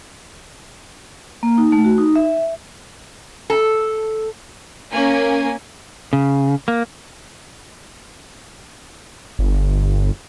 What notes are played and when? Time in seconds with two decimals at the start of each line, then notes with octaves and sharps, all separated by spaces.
1.43 A#3
1.58 D#4
1.72 A3
1.84 F#4
1.98 D#4
2.16 E5
3.50 A4
4.93 A#3 C#4 G#5
6.13 C#3
6.68 A#3
9.39 G1